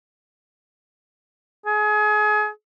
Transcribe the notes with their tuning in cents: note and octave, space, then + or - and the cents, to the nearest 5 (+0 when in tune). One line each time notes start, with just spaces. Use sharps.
G#4 +30